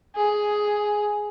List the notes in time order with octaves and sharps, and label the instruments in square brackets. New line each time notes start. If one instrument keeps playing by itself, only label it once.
[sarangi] G#4